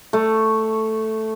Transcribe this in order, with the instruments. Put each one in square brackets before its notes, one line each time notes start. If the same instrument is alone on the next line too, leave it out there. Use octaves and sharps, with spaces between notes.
[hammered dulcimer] A3